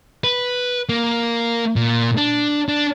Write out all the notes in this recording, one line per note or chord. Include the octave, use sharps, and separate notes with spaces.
B4
A#3
A#2
D4
D4